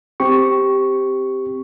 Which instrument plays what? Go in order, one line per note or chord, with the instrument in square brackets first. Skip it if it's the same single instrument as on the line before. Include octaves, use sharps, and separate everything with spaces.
[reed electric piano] C4 G4 C#6